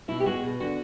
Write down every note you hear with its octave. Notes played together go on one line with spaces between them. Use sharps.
B2 E4
G4
G#3 F#4
B2
D3 F#4